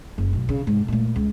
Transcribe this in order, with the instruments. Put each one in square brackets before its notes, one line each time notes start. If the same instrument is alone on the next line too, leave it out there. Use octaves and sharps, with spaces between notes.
[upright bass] F#1
B1 A2
C#3
G#2 C3
A#2 A3
C#2